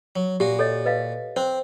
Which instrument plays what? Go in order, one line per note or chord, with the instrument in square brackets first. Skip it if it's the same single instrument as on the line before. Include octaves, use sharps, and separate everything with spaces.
[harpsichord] F#3
[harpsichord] A#2 F#4 [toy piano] G4
[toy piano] A4 C#5 D#5
B4 D#5 F5
[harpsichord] C4 [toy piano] C5